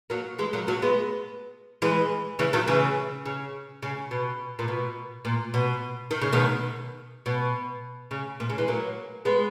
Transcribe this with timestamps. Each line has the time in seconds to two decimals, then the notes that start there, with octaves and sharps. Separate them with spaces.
0.10 F#3 A#3
0.38 E3 G#3
0.53 F#3 A#3
0.67 F#3 A#3
0.82 G#3 B3
1.82 E3 G#3
2.39 C#3 E3
2.53 D#3 F#3
2.68 C#3 E3
3.26 C#3
3.82 C#3
4.11 B2
4.59 A#2
4.68 B2
5.25 A#2
5.54 B2
6.11 D#3
6.21 C#3
6.32 B2 D#3
7.26 B2
8.11 C#3
8.40 A#2
8.50 C#3
8.58 E3 G#3
8.68 F#3 A#3
9.25 G#3 B3